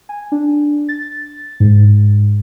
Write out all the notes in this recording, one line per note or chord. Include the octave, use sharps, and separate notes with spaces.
G#5
D4
A6
G#2